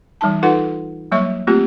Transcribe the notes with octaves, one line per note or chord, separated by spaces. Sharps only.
E3 G3 D#4 A5
D#4 F4 A4 B4 F#5 C6
F#3 G3 A#3 C#5 E5 C#6
A3 A#3 C4 F4 G4